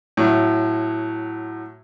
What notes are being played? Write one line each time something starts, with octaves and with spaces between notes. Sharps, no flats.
A2 F#3